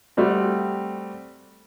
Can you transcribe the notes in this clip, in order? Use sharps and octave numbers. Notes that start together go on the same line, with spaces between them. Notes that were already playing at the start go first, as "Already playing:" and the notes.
G3 A3 C4 F#4